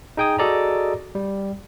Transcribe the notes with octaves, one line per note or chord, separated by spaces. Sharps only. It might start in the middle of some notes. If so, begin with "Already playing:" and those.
D#4 G#4 G5 G#5 D#6
F#4 G#4 A4 D5 D#5 A#5
G3